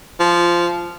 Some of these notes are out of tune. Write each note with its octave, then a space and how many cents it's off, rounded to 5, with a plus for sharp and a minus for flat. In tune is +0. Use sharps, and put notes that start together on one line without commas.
F3 -10